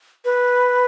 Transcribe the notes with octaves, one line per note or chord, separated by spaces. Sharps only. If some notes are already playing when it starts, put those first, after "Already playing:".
B4